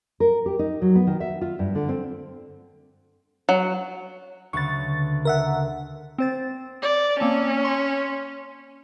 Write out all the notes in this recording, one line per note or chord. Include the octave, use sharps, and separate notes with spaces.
A#4
G4
D#4
F#3
B3
D#3
E5
F4
G2
D3
C4
F#3
D2 C#3 B4 C#6 A6
A#4 E5 F#5
C4 C5 A6
D5
A#3 C4 C#4 A5
C6 C#6 C#7